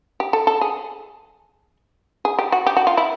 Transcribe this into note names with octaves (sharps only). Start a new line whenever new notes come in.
G4
A4
A4
G#4
G#4
G4
F#4
G4
F#4
F4
E4